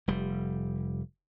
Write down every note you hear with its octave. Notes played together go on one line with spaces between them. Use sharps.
F1 G3